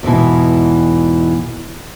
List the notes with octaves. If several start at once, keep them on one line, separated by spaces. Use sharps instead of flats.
E2 G#2 B2 E3